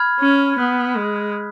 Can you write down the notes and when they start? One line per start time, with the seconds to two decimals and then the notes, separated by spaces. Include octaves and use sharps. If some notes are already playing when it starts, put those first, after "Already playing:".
Already playing: B5 F6 G#6
0.20 C#4
0.58 B3 D#6 F#6 B6
0.97 G#3